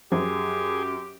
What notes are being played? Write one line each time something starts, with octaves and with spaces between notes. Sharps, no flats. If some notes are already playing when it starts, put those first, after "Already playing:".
F#2 F3 G4 G#4